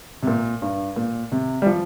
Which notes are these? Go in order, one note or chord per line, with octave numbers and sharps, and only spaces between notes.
C3
A#2
G2
A#2
C3
G3
F3